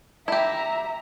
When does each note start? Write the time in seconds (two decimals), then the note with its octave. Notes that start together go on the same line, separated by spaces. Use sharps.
0.28 E4 G4 E5 A#5